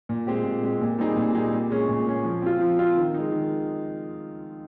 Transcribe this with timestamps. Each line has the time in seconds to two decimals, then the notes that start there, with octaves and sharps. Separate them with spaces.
0.09 A#2
0.27 G#3 C4 G4
0.45 A#2
0.63 G#3 C4 G4
0.81 A#2
0.99 G3 C4 D#4 G#4
1.16 A#2
1.35 G3 C4 D#4 G#4
1.53 A#2
1.70 G#3 C#4 G#4
1.89 A#2
2.07 G#3 C#4 G#4
2.25 F3
2.42 C4 F4
2.61 F3
2.79 C4 F4
2.97 D#3
3.14 G#3 D#4
3.32 D#3